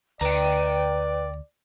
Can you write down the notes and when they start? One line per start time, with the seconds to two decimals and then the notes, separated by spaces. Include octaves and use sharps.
0.21 D2 B4 D5 G5 A#5